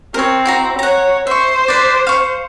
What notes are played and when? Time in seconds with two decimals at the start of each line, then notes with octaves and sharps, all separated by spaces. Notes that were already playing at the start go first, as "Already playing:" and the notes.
0.14 C4 A#4 C#5
0.45 E4 F#4 A#5
0.79 C#5 F#5 A#5
1.27 C5 E5 C#6
1.68 B4 D5
2.07 F5 C#6